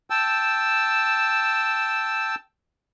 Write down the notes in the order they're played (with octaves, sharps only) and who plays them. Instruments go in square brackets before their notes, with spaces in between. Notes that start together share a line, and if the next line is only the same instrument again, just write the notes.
[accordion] G5 A5 E6